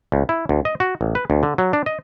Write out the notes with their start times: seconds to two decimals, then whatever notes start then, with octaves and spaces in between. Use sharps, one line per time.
0.12 C#2
0.29 E4
0.49 D2
0.65 D#5
0.80 F#4
1.01 A1
1.15 B4
1.30 D2
1.43 D3
1.58 F#3
1.73 D4
1.86 D#5